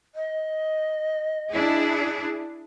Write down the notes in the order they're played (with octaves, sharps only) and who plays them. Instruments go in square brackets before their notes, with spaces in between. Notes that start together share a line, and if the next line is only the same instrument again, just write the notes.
[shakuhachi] D#5
[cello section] D4 E4 G#4